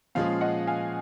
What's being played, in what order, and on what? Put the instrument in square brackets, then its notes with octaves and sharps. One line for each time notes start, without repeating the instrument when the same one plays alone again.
[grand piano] A#2 F3 G#3 C#4 G#4 [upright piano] F5
[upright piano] D#5 F#5
F5 G#5